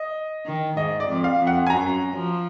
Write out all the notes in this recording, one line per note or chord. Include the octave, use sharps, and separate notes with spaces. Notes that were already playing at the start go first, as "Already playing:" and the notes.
Already playing: D#5
D#3
G#2 D#5
D5
F2
F5
F2
F#5
G#5
F#2 A#5
F3